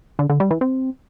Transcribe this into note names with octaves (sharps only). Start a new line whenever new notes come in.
D3
D3
G3
E3
C4